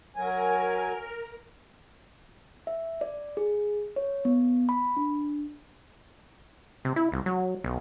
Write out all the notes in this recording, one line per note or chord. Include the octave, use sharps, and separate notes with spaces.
F#3 A#4 G#5
E5
D5
G#4
C#5
B3
B5
D4
C3
E4
C2
F#3
B1